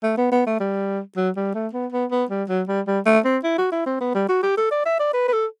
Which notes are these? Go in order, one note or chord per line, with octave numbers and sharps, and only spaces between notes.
A3
B3
B3
A3
G3
F#3
G3
A3
B3
B3
B3
G3
F#3
G3
G3
A3
C4
E4
F#4
E4
C4
B3
G3
F#4
G4
A4
D5
E5
D5
B4
B4
A4